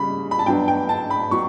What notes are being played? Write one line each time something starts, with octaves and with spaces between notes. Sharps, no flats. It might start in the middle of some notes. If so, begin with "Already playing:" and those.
Already playing: C#3 G3 B5
B5
A5
G2 F#3 B3 D4 G5
G5
A5
B5
F#3 C#6